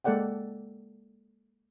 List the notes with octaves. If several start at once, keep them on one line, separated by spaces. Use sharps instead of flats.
G#3 A#3 A4 D5 F#5 G5